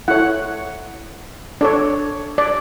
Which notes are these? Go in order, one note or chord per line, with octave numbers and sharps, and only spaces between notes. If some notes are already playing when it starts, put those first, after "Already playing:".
E4 A4 C#5 F#5
D4 A4 C#5 D5
D5